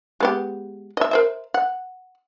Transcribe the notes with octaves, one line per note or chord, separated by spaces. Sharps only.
G#3 B3 G4
D#5 E5
A#4 C5 E5
F#5